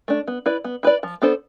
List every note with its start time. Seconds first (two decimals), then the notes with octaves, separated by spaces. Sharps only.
0.08 A3 D4
0.28 B3
0.46 E4 B4 D5
0.64 B3
0.83 E4 B4 D5
1.03 F3
1.22 B3 D4 A4 C5